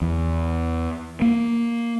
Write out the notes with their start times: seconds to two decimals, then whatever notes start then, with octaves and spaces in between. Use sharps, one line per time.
0.02 E2
1.22 A#3